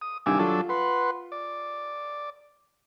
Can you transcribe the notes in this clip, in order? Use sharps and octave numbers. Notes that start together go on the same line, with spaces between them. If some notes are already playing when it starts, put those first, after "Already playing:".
D#6
C2 G2 D#3 G#5 D6 E6
F#3 D4 F4 A4
B4 F#5 C6
D5